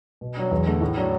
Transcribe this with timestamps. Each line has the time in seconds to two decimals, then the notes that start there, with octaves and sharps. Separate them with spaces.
0.21 B2
0.36 F#3 D4
0.51 E2
0.66 D3 A3
0.81 A2
0.97 F#3 D4